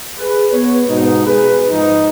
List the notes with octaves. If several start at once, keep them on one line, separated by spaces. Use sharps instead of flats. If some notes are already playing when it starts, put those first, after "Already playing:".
G#4 B4
B3 C#5
G#2 B2 D#4
G#4 B4
G#2 F3 D#4